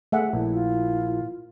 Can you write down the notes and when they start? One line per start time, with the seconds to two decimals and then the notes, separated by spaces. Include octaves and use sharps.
0.12 A3 G#4 E5 F#5
0.33 A#1 E4
0.53 F4